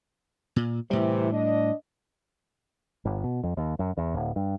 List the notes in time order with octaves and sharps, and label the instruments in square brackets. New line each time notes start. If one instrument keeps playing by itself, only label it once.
[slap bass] A#2
[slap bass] A2 G3 [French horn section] C3 E3
[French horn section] D4 D#5
[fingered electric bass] G1
B2
F2
D#2
F#2
E2
D1
G2